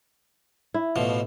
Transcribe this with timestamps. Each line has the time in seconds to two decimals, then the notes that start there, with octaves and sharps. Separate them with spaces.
0.74 E4
0.96 A1 B2 F3